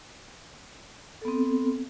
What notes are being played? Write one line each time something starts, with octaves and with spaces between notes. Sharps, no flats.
B3 C4 A4